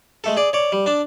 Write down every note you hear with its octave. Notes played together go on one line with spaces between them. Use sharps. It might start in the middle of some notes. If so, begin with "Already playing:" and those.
G#3 A3 A4
G#4 D5
C#5 D5
G3
D4 A5